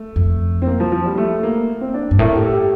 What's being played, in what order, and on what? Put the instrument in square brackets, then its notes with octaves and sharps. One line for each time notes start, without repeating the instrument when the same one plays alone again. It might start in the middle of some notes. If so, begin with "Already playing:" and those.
Already playing: [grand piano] A3
[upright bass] F2
[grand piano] C4
A#3
F3
F3
G3
A3
A#3
C4
D4
[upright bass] G2
[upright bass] A2 [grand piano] A#4
[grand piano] G4
A4
G4